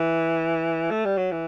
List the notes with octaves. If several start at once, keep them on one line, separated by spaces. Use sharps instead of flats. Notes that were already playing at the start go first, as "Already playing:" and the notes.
Already playing: E3
A3
G3
F#3
E3